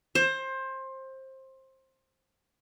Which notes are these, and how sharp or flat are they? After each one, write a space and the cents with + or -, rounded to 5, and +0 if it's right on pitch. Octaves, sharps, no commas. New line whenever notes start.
C5 +20